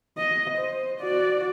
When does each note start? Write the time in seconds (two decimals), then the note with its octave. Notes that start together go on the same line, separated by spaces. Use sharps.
0.18 D#5
0.58 C5
1.00 F#4 D5